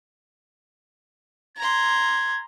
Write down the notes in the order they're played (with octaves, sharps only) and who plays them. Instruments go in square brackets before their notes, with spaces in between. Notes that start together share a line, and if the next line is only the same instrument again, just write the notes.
[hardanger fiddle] A#5 C6 [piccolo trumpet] G#6